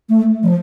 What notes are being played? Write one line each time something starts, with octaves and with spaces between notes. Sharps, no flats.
A3
F3